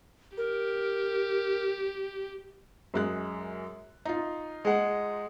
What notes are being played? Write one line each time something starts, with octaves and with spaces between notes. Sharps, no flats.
G4 A#4
F#2 G#3 F#6
D#4 F4
G#3 F#5